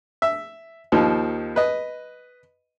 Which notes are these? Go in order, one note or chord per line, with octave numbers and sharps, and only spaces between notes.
E5
D#2 F3 D#4
B4 D#5